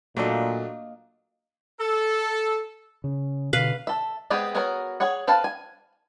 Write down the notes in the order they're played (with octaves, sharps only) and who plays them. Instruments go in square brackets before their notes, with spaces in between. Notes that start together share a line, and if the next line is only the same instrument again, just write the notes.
[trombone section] A#2 [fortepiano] F#3 A3 D4 [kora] A#3 D#5
[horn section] A4
[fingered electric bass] C#3
[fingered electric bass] B2 D3 [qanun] B4 F5
[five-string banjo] A4 E5
G#3 B3 C4 G4 G#4
B3 F#4 G#4 A#4 C#5
G#4 C#5 F#5
C4 A4 B4 F5 A5
G#5